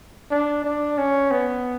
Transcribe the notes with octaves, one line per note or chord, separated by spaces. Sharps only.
D4
D4
C#4
B3